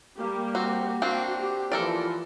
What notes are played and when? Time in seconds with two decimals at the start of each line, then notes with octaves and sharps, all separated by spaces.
0.17 G3 A#3 G4
0.55 C4 F#4
1.02 A#3 C4 D4 F#4
1.39 G4
1.72 E3 F3 A4 A#4 D5